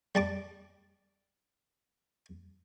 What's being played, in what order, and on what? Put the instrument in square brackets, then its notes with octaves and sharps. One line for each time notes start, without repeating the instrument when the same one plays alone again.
[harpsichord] G3 A5 D6